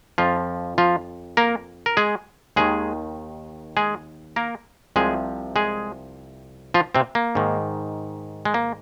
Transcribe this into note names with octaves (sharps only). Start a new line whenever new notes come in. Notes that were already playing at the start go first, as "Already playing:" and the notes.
F2 F3 F4
F3 F4
A#3 A#4
A#4
G#3 G#4
D#2 D#3 G#3 G#4
G#3 G#4
A#3 A#4
C2 C3 F3 G#3 G#4
G#3 G#4
F3 F4
C3 C4
A#3
G#2 D#3
G#3
A#3